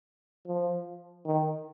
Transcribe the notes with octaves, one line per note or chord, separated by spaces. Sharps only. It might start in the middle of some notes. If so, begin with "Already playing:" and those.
F3
D#3